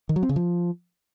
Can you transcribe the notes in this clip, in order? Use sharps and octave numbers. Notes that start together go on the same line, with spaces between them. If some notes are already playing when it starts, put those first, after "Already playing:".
D#3
F#3
C4
C#3
F3